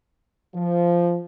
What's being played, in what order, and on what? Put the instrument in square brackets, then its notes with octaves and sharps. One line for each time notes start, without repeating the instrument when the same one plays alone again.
[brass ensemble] F3